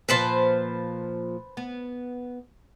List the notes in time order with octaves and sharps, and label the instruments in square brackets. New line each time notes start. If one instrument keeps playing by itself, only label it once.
[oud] A#2 F3 [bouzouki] B4 C5 A5
[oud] B3